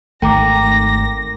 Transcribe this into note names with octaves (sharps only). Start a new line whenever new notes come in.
G#1 D#3 A3 G5 A#5 D6 A#6